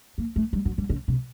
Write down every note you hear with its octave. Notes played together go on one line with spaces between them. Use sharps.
A#3
A3
G3
F#3
G3
C#3
C3